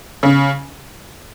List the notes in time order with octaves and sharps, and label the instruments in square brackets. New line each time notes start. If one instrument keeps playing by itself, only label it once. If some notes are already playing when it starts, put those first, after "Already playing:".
[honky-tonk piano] C#3